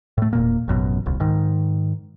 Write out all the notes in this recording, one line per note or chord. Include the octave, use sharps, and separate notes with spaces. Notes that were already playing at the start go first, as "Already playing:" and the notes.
A2 A3
E1 A#2 A#3
A1 F#2 B2
D#1 C2
G#2 D#3